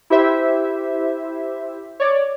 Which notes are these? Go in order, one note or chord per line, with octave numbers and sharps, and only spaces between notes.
E4 G4 C5 E5
C#5 D5